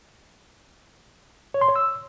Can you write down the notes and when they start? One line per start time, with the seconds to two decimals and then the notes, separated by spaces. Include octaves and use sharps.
1.54 C#5
1.61 C6
1.69 C#5
1.76 E6